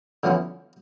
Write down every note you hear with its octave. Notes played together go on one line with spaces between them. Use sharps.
D3 F3 B3 C#4 E4